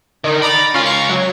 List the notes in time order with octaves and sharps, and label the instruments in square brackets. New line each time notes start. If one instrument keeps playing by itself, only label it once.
[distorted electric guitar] D3 [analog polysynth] D#3 D#4
[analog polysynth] D5 A#5 D6 [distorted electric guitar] B5
[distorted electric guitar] C#2 F5 [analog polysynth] C#4 F4
[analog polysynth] A#5 C#6
F#3